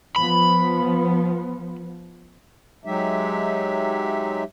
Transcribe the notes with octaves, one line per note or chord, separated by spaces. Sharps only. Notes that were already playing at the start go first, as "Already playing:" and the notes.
F3 B3 B5
F#3 G#3 D#4 G4 E5